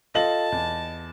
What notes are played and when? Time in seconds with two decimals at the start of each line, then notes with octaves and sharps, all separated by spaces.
0.15 F4 A4 D#5 F5 A5 A#6 F#7
0.52 E2